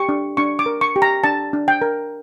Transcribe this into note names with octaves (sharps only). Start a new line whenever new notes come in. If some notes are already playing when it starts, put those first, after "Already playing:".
Already playing: G4 C#6
D4
D4 C#6
D6
A#4
C#6
G4
A#5
D4 A5
D4
G5
A#4